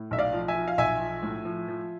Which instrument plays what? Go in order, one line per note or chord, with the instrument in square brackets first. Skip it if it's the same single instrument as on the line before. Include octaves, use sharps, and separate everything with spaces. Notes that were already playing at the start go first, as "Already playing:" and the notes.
Already playing: [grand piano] A2
B1 E5
D5 F5
F3
E5 G#5
F3
F5
B1 E5 G#5
F3
A2
F3
F3